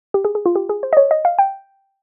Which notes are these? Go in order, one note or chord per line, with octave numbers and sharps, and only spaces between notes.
G4
G#4
G#4
F4
G4
G#4
C5
D#5
C#5
D#5
F5
G5